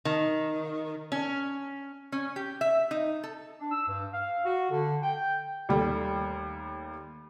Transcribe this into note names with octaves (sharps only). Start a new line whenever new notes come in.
D#3
C#4
C#4
G4
E5
D#4
A4
D4
E6
G2
F5
F#4
D3
G5
D#2 G3 A3